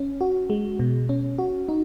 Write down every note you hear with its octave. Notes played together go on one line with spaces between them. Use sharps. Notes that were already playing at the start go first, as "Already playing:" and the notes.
Already playing: C#4
F#4
G#3
B2
C#4
F#4
D#4